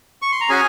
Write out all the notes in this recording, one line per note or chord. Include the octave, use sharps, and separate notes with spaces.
C#6
C6
A#5
C#4 F#4 G#4 G#5